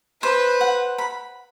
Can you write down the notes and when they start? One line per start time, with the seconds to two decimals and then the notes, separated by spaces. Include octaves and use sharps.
0.22 B4 C5
0.61 F#5
0.98 B5